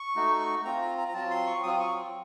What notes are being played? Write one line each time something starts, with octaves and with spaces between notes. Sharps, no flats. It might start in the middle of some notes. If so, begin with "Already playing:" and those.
Already playing: C#6
A3 D#4 F#4
C4 F4 A#5
A#5
A#5
A#5
F#3 C4 F4 A5
C6
C#6
F#3 C4 F4 D#6
D#6
C#6